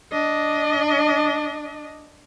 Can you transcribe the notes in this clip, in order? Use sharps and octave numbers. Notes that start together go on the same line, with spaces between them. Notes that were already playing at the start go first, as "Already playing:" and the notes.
D4 D#5